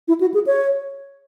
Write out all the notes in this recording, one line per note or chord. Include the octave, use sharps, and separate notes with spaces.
E4
F#4
G#4
C#5